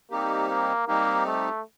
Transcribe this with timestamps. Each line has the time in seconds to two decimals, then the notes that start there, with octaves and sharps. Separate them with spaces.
0.11 G3 A#3 C4 D#4 G4
0.49 A#3
0.87 G3 A#3 C4 D#4 G4
1.26 A3